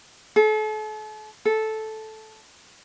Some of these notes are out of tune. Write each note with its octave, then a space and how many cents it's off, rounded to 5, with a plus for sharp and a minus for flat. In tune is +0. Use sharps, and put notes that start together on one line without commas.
A4 -40
A4 -10